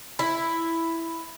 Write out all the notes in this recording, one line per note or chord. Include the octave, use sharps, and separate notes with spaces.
E4